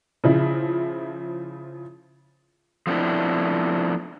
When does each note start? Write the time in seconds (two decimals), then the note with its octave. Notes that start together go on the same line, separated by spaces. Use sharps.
0.24 C#3 F3 E4
2.87 F3 A3 B3 C4 D4 E4